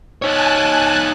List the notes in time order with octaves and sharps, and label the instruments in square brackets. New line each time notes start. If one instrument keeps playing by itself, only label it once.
[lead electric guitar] D#4 C#5 [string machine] G#5 A5 F#6